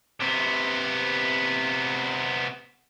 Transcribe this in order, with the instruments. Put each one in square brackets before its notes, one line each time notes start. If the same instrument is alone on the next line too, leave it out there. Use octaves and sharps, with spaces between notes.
[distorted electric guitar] C3 B3